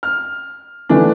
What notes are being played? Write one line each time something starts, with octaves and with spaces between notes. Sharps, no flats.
F6
D3 E3 A3 B3 D4